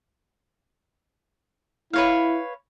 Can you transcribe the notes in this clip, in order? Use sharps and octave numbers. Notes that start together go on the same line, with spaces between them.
E4 B4 C#5 F5